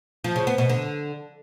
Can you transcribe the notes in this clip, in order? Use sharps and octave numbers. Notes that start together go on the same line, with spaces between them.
F3
C#3
B3
B2
D3